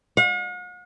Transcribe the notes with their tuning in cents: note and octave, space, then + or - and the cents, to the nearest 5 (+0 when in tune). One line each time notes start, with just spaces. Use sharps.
F#5 -45